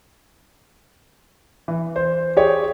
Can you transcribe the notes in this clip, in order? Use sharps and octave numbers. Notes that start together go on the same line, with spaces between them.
E3
C5
G4 G#4 C#5